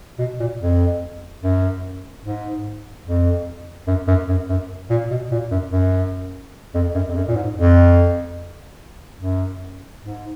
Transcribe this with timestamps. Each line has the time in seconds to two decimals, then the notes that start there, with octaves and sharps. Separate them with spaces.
0.19 B2
0.39 A#2
0.60 F2
1.42 F#2
2.24 G#2
3.05 F2
3.87 F#2
4.08 F#2
4.28 F#2
4.49 F#2
4.90 A#2
5.10 B2
5.31 A#2
5.51 F#2
5.71 F#2
6.74 F2
6.95 F#2
7.08 F2
7.16 F#2
7.28 A#2
7.36 G#2
7.57 F2
9.20 F#2
10.02 G#2